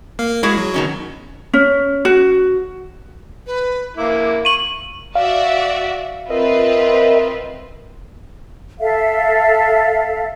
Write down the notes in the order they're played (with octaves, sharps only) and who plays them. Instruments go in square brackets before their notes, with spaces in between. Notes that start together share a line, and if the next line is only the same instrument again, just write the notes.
[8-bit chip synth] A#3 F5
[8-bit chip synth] G#3 [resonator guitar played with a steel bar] E4 F#4 G#4
[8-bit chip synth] F#3
[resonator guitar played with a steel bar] B2 D#3 C#4
[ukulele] C#4
F#4
[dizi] B4
[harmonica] A#3 E4 [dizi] D6
[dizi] C#6 [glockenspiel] D#7 F#7
[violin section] F#4 D5 E5 [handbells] F5
[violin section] C4 F4 B4 [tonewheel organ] A#4 D#5 E5
[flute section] A4 E5 F5